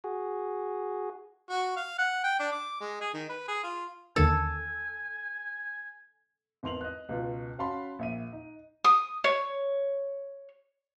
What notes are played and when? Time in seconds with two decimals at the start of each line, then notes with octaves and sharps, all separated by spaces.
0.04 F#4 G#4
1.49 F#4
1.76 F5
1.98 F#5
2.24 G5
2.39 D4
2.52 D6
2.81 G#3
3.01 G#4
3.14 D#3
3.29 B4
3.48 G#4
3.64 F4
4.16 D#2 D3 D#3 A4 G#5
6.63 G#1 E2 C6 F7 F#7
6.81 D#5 F#6
7.09 C#2 B2 F4
7.58 C#4 F#4 F5 A5 B5 C6
7.99 A#1 E5 D#7
8.33 D#4
8.84 D#6
9.24 C#5